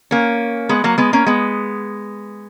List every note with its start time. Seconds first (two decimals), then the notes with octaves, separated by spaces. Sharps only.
0.11 A#3 C#4
0.69 G#3 B3
0.84 F#3 A#3
0.98 G#3 B3
1.13 A#3 C#4
1.26 G#3 B3